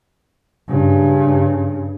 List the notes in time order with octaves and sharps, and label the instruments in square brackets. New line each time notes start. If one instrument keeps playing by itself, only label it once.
[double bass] G2 C#3